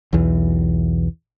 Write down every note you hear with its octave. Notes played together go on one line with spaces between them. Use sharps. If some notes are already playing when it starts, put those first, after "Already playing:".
B1 E2 E3